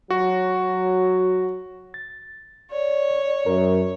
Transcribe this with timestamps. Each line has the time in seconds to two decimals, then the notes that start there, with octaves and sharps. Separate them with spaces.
0.10 F#3 F#4
1.94 A6
2.71 C#5 D5
3.46 F#2 A#4